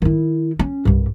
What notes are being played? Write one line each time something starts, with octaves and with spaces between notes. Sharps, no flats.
D#3 E4
C#4
C2 G2